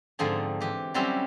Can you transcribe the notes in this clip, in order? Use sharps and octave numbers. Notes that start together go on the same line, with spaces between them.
G#2 D3 F3 C4 G#4
E3 G4
F#3 G3 C4 C#4 E4 G4